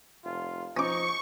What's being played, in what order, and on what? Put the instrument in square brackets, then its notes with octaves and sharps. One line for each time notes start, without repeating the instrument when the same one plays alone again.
[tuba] F1 [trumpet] F4
[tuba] F3 [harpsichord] C#4 D6 [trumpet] D#4 [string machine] C#6